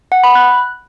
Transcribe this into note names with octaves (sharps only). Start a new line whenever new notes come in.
F#5
B5
F#6